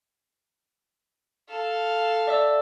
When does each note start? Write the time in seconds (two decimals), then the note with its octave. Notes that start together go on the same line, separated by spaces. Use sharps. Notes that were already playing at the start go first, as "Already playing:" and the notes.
1.49 A4 F5
2.27 D5 E5 E6